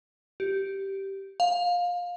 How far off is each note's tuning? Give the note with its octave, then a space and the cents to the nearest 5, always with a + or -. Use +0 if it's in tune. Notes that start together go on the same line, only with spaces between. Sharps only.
G4 -10
F5 +20